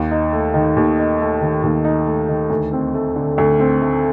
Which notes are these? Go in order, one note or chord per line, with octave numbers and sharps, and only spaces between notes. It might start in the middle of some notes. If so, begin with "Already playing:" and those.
Already playing: D#2
D#4
A3
D#3
D#2
D#4
A3
D#3
D#2
D#4
A3
D#3
D2
C4
A3
D3
D2
C4
A3